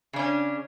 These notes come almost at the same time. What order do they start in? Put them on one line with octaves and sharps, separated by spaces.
C#3 D4 C#4